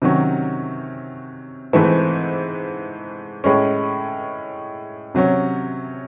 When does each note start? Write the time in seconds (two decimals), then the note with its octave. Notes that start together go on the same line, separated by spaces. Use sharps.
0.02 C3 D#3 F#3 C#4
1.73 G#2 E3 A3 C4 E4
3.44 A2 G#3 C#4
5.15 C3 F#3 C#4